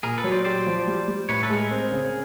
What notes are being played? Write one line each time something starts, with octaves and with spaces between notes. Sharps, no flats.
A#2 G#4 A#4
A4 B4
F#3
C5 D5
G4 C5 D5
F3
G3
G3
A2 B4 C#5
A4 B4
G#3
G#4 A#4
C4
C#3